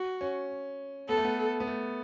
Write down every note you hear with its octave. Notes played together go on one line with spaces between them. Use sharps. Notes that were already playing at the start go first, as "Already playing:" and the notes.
Already playing: F#4
C#4
B3 A4
A3
B3
B3
A3